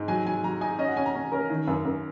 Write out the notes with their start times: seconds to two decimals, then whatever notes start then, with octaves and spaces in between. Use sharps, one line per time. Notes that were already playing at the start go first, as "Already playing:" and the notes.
Already playing: G#2
0.08 F#3 G#5
0.25 F#3 G#5
0.43 F#3 A#5
0.61 D#4 G#5
0.79 C#4 D#5
0.88 F#5
0.97 C#4 G#5
1.06 A#5
1.15 C#4
1.32 C#4 A#4
1.50 D#3
1.68 F#2
1.85 F#2